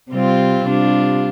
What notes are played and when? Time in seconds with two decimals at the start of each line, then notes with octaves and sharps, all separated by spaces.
0.11 C3 G3 C4 F4
0.66 C3 G3 D4 F4